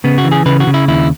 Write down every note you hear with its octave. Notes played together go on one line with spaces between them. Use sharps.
C#3 B3
F#4
E3
G#4
C#3 B4
F#4
C#3
E4
D#2 E4